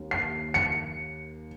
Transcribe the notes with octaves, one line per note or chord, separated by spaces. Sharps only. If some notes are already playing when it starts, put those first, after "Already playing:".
Already playing: D#2
C7
C#7